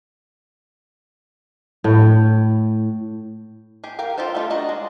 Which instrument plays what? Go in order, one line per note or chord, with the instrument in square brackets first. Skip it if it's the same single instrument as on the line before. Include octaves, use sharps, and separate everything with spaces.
[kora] A2
[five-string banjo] G4 G#4
A#4 F5 G5
D#4 F4 G4 A4 C5
G3 A3 D#4 F4 A4
D4 F#4 D#5 A#5
G#3